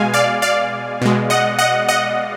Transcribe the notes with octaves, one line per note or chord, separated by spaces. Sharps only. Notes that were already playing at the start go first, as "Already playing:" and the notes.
Already playing: B2 G#3 F5 G#5
D5 F5
D5 F5
B2 G#3
D#5 F#5
D#5 F#5
D#5 F#5